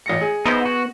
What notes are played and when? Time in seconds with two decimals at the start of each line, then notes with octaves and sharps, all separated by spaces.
0.06 A1 A#6 C#7
0.21 G#4
0.46 B3 D#4 E4 C5
0.66 F#4